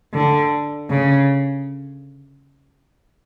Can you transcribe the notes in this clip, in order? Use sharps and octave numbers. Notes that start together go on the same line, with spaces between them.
D3
C#3